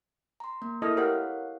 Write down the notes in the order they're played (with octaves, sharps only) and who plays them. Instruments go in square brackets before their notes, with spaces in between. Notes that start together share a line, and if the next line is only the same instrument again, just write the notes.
[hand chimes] A#5 C6
A#3
[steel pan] E4 A4 D#5 [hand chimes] A#4 F6
[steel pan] G4 A#4 [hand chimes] C#5 F5 F#5